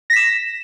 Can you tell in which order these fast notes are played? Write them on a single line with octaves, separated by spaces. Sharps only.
A#6 B6 E7